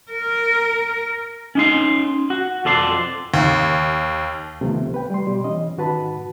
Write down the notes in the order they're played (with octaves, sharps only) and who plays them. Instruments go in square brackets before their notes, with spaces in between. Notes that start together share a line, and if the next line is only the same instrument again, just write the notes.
[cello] A#4
[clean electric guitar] C#4 D#4 C6
F#4
F2 A4 D5 C6
[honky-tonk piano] D#2
[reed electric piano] C#2 C3 D#3 F3 A3 B3
B4 G5
G3 C6
B2 G3 G4
E3 C#4 D#5
G#2 D#3 F#4 B4 A5 B5